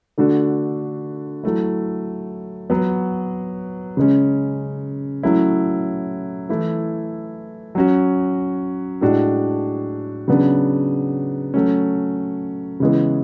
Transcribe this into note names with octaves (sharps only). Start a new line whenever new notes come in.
D3 A3 D4 F#4
F#3 A3 E4
F#3 B3 F#4
C#3 G#3 C#4
F#3 A3 C#4 E4
E3 A3 E4
F#3 C#4 F#4
A2 G#3 D4 F#4
C#3 F#3 B3 D4
F#3 A3 C#4
C#3 E3 G#3 B3